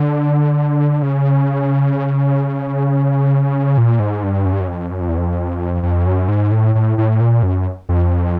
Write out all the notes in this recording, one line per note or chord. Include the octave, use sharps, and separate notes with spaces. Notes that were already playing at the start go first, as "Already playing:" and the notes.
Already playing: D3
C#3
A#2
G#2
G2
F#2
G2
F#2
F2
F#2
F2
E2
F2
F2
F#2
G#2
A2
A2
A2
A#2
F#2
F2